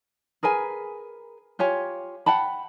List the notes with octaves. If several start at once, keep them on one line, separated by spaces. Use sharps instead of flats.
G#4 A#4 B4 G#5
F4 G4 C#5 G#5
F#5 G5 A5 B5